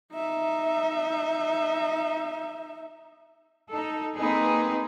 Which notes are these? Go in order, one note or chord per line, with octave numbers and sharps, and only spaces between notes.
D#4 E5
D#4 A4
A#3 C4 D#4 G#4 B4